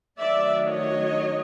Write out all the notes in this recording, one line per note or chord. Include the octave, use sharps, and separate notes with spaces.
D#3 F#3 A3 D4 D5 E5
C#5 D#5